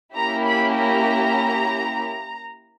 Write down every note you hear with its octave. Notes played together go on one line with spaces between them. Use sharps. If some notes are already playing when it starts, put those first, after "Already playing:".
A#3 C#4 E4 G4 A#5
B5
A#5